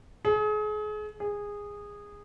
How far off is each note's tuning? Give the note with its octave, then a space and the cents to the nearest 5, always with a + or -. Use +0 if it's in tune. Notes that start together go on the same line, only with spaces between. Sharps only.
G#4 +35
G#4 -15